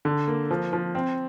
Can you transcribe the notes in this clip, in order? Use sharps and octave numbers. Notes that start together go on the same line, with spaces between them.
D3
A#3
F3
F3
C4